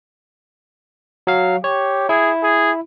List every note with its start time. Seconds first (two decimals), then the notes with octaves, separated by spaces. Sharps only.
1.27 F#3 F5
1.64 G4 C#5
2.09 E4 G#4
2.43 G#4